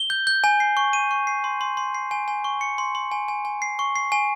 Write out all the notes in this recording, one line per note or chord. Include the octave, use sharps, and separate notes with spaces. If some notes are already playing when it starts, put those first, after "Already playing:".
Already playing: G7
G6
G6
G#5
C7
C#6
D#7
C#6
C7
C6
C6
C6
C7
G#5
G#5
C#6
C#7
C6
C6
G#5
G#5
G#5
C7
C#6
C7
G#5